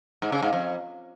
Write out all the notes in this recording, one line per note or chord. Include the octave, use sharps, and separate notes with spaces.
G#2
C#3
G#2
F2